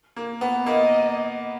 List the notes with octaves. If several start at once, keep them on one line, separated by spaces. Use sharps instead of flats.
A#3
B3
A#3 D#5